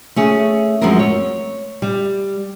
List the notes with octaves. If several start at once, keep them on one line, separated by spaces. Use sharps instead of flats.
A3 C#4 G#4
F#2 F3 G#3 C4 A#4
C#5
G3